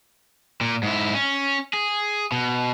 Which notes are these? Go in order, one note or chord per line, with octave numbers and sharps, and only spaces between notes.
A#2
G#2 E4
C#4
G#4
B2